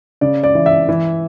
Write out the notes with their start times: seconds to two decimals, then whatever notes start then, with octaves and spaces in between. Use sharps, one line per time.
0.21 C#3 D5
0.44 D5
0.55 E3
0.66 E5
0.89 E3